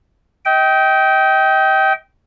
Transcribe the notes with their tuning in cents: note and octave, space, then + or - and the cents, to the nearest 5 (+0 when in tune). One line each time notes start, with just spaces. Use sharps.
D#5 +35 G5 -15